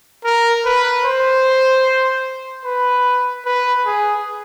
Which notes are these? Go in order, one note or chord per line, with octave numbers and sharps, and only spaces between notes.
A#4
B4
C5
B4
B4
G#4